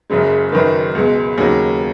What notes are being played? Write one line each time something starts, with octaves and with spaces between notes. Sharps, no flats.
F#1 F#2 C#3 G#3
F#1 F#2 D#3 B4
C#2 B2 G#3
D#2 C#3 F#3